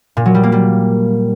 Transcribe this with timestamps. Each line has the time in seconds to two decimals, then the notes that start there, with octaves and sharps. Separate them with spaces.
0.17 A#2
0.26 F#3
0.34 G3
0.43 A#3
0.52 G3